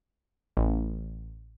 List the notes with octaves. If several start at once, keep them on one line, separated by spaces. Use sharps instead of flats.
A1